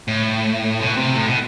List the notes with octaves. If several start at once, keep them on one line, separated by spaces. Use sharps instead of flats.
A2
B2
C3
A2
B2